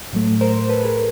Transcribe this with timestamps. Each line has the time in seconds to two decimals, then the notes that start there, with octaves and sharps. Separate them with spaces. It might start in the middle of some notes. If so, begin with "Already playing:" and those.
0.13 A2 F#3 A3
0.41 A#4 C5
0.55 A#4 C5
0.69 A4 B4
0.84 G#4 A#4